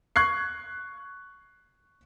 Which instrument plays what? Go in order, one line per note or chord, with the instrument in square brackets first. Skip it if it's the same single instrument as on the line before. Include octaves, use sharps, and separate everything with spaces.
[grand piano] C#6 F#6 G#6 C7